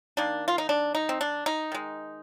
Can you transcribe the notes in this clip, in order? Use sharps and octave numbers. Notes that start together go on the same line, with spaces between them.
D#3 A#3 D4
F4
D#4
D4
D#4
C4
D4
D#4
D#3 G#3